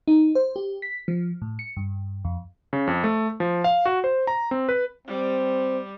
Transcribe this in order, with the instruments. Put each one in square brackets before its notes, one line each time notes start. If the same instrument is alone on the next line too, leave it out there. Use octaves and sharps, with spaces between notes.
[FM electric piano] D#4
C5
G4
B6
F3
A2
C#7
G2
F2
[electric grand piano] C#3
F2
A3
F3
F5
F#4
C5
A#5
C4
B4
[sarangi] G3 [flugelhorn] C4